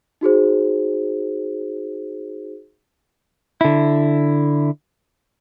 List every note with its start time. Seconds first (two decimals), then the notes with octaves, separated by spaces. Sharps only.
0.21 D#4 F#4 G#4 C5
3.61 D3 E4